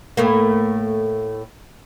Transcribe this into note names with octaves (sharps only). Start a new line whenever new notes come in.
A2 A3 A#3